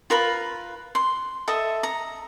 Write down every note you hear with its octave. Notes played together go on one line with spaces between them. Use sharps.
F4 A#4 B4 B5
C6
A4 D#5 E5
A#5